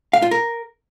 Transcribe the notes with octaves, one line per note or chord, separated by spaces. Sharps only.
F5
F4
A#4